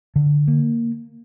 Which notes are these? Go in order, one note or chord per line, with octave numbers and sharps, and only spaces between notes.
D3
A#3